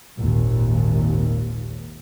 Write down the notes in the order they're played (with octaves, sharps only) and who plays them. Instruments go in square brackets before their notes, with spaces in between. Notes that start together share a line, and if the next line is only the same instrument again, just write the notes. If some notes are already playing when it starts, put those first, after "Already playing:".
[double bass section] G#1 D#2 A#2